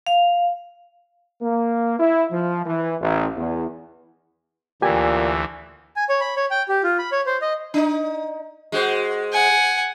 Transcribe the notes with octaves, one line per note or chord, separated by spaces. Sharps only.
F5
A#3
E4
F3
E3
A1
E2
D2 A#2 E3 G4 G#5
G#5
C#5
B5
C#5
G5
G4
F4
B5
C#5
C5
D#5
D4 D#4
G#3 F#4 C5
F#5 G#5